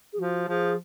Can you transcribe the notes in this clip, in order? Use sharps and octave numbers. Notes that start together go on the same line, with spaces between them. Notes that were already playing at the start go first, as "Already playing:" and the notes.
G#4
F3 F#4
F3 G#4